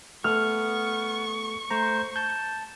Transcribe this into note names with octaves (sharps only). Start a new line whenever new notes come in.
A3 B3 A4 C#6 F6
A3 C5 A#5
A5 G6